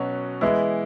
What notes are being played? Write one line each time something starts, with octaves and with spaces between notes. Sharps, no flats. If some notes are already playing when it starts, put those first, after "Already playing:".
Already playing: B2 F#3 C#4 F#4
E3 G#3 B3 E4